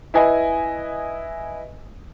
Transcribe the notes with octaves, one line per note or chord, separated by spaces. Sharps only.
E4 B4 D#5 G#5